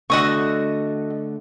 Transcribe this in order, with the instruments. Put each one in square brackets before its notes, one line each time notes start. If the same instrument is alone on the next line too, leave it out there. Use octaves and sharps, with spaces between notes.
[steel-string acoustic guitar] D3 A3 [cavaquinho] F#4 D#5 C#6